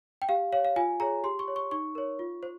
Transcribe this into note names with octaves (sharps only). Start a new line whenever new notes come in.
G5
G4 F5
C#5 F5
F5
F4 G#5
G#4 C#5 A#5
G4 C6
C#6
C#5
C#6
D#4 C#6
A#4 C#5
F4
C5